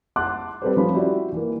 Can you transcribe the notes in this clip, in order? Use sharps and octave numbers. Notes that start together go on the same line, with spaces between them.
F#5 A5 C6 D6 F#6
G3 C4 A4 B4 C5
F3 C#4 B5
E4 F#4 G4 D5
E3 A#3